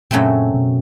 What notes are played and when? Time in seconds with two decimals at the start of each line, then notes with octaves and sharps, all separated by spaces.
0.11 F#2 A#2 C#3 F#3 A3 C4
0.54 B2